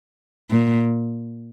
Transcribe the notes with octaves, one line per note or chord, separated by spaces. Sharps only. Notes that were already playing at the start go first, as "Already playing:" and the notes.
A#2